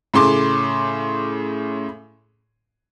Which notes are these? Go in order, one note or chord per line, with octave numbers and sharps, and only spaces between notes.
A2 C#3 C6 D6